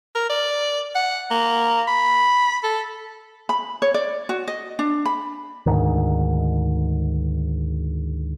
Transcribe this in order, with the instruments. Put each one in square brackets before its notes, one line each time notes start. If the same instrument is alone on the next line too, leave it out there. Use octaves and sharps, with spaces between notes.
[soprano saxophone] A#4
D5
F#5
A#3
B5
A4
[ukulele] B5
C#5
D5
F#4
D#5
D4
B5
[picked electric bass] D2 G#2 D#3